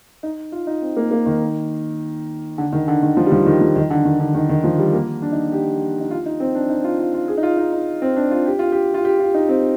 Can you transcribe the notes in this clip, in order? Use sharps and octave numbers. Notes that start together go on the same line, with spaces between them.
D#4
F4
D#4
C4
A#3
A#3
D#3
D3
D#3
D3
D#3
F3
G3
F3
D#3
F3
D#3
D3
D#3
D3
D#3
D#3
F3
G3
A#3
D4
D#4
G4
D#4
F4
D#4
C4
D4
D#4
F4
F4
F4
G#4
D#4
F4
D#4
D#4
C4
D4
F4
G4
F4
G4
F4
G4
F4
D#4
C4